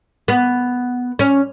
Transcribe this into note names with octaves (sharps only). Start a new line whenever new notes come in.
B3
C#4